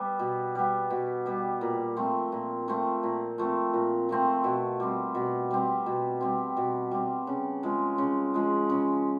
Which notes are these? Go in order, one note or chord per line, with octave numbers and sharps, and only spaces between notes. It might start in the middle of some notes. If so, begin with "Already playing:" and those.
Already playing: G3 B3
B2
G3 B3
B2
G3 B3
A#2
F3 A3 C4
A#2
F3 A3 C4
A#2
F3 A3 C4
A#2
F3 A3 C4
B2
G3 C4
B2
G3 C4
B2
G3 C4
B2
G3 C4
C#3
F3 G#3
C#3
F3 G#3
C#3